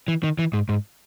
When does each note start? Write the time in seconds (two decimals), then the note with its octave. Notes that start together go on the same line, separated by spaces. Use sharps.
0.08 E3
0.23 D#3
0.39 E3
0.53 G#2
0.69 G#2